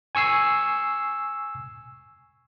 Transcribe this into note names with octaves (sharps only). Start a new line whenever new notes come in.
G#5 C#6 E6 C7